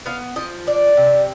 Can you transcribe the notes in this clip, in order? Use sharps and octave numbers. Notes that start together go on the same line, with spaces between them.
B3 F5
F3 D#5
D4 D5
C3